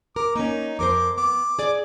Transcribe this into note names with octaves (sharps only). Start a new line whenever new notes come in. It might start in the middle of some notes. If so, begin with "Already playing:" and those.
A#4 D6
A#3 C#4 D#4
F2 A#4 C5 D6
B3 D6
G#4 D5